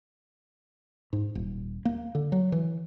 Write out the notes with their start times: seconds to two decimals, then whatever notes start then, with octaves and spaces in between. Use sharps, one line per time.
1.13 G#2
1.35 D#1
1.85 A#3
2.15 D3
2.32 F#3
2.52 E3